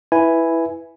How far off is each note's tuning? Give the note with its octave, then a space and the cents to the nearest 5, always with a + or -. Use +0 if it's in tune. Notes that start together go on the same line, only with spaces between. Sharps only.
E4 +0 B4 +0 G#5 +0